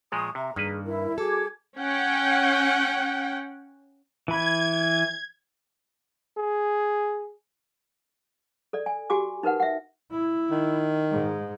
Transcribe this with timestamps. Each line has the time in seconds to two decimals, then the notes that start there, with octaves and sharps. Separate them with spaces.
0.12 A#2 F3 G#3 C#6 D#6
0.35 C3 E5 A#5
0.56 G2 D#3 A#3 G#4 B4
0.84 E4 A#4
1.18 F#4 G#4 A4 D6 G#6
1.78 C#4 F#5 G5
4.28 E3 B5 G#6
6.38 G#4
8.73 A4 D5
8.86 G#5
9.10 F#4 G4 G#5 D6
9.43 D#4 A#4 B4 F#5
9.60 E5 F#5
10.11 E4
10.51 D#3
11.11 G#2